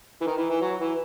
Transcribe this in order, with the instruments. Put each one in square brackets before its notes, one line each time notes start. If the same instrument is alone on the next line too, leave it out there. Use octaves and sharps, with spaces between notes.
[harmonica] E3
D#3
E3
E3
F#3
E3